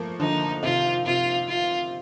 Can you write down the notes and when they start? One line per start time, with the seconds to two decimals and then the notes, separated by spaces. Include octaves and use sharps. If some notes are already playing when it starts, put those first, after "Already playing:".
Already playing: F3 A3 A#3
0.20 D3 F3 D#4
0.63 C3 D#3 F4
1.06 C3 F4
1.48 F4